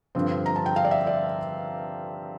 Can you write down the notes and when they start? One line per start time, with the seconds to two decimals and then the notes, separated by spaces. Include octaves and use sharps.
0.15 G2 D3 F3 C4
0.46 A#5
0.56 A5
0.66 G5
0.76 F5
0.85 D5
0.91 E5
1.07 D5